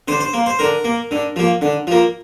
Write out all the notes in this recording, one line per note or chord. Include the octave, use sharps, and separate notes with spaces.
D3 C5
C5
A#3
C5
D3 A#4
A#3
D3
F3 A#3
D3
F3 A#3